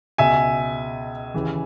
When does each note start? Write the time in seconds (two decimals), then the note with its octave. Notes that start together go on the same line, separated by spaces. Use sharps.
0.18 C#2 B2 E5 G#5
1.34 D#2 C#3 E3